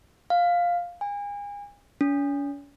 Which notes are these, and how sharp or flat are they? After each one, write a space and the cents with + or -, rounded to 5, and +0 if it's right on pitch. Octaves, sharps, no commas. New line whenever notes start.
F5 +5
G#5 -35
C#4 +45